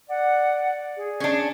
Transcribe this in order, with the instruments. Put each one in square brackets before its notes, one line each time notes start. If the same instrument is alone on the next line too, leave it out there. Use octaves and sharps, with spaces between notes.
[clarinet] D5 [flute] F#5
[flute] G#4
[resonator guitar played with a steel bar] C#4 D4